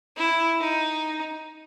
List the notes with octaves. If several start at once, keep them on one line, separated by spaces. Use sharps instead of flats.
E4
D#4